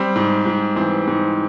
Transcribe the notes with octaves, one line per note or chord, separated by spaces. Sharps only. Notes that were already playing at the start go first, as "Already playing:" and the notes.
Already playing: G3 C4
G#2
G#2
E3 C4
G#2